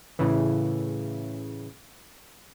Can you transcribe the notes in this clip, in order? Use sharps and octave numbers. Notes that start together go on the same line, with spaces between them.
A2 C#3 E3